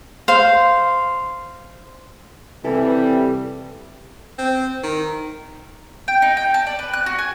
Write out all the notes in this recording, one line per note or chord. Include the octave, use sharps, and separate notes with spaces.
C5 F5
C3 E3 G3 A4
C4
D#3
G5
D#4
G5
A5
D5
B4
F#6
F#4
G#5